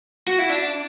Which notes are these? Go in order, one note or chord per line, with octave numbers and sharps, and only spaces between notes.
F#4
E4
D4